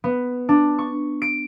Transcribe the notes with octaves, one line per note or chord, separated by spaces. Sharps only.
B3
D4
C#6
D7